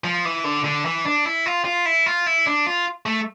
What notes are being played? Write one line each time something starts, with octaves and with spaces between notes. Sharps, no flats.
F3
E3
D3
D3
E3
D4
E4
F4
F4
E4
F4
E4
D4
F4
A3